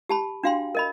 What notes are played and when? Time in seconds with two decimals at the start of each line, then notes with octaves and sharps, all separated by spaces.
0.09 G4 A5 B5
0.43 D4 F#4 F5 G5 C6
0.75 A#4 D#5 B5